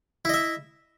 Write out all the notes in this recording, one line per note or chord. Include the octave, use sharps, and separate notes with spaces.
E4 D#5 E5